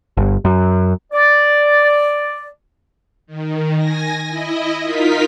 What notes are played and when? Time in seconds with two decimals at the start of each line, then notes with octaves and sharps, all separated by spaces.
0.17 G1
0.45 F#2
1.12 D5
3.27 D#3
3.77 G#5 A#6
4.29 E4 D#5
4.82 D#4 F4 A#4 B6